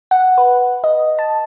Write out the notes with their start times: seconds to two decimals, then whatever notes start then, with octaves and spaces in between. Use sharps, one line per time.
0.11 F#5
0.38 B4
0.84 D#5
1.19 A5